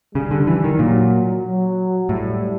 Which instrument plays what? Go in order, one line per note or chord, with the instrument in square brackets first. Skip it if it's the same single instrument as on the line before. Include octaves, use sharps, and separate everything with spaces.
[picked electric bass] C#3 [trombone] G3
[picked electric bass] D3
E3
D#3
[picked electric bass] A#2 [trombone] F#3
[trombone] F#3
[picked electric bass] A2 [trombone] G3